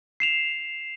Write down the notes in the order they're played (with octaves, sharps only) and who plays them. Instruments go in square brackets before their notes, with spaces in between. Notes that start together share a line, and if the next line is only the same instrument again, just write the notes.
[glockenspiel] C7 E7 F7